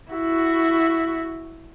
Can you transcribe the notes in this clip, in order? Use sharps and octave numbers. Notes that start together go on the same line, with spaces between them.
E4 F#4